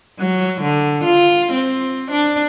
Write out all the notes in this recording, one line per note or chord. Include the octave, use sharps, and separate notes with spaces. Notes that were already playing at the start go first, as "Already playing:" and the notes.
F#3
D3
F4
C4
D4